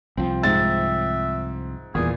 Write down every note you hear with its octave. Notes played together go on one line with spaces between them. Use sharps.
C2 F3 C4
G#2 E5 A6
D#1 E2 A#2 E3 G#4